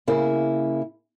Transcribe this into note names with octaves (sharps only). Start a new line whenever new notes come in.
C#3 A#3 E4